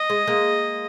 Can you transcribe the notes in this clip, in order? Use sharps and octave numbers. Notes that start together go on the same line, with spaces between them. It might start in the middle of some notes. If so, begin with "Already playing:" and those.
Already playing: D#5
G#3
G#3 A#3